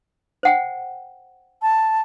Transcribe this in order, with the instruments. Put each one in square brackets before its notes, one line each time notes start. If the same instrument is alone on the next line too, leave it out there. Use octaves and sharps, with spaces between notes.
[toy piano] C5 F#5 G5
[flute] A5